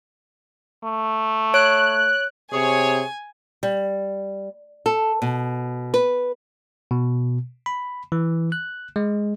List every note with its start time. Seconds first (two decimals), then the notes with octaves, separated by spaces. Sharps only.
0.84 A3
1.54 C#5 F#6 D7
2.53 C3 G#4 C#5 G#5
3.63 G3
4.86 A4
5.22 B2
5.94 B4
6.91 B2
7.66 B5
8.12 E3
8.52 F#6
8.96 G#3